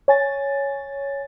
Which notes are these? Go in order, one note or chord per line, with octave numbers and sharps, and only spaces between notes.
C#5 G#5 A6